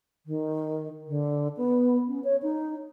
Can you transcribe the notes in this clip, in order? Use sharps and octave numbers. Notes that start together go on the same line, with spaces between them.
D#3
D3
B3
C#4
C#5
D#4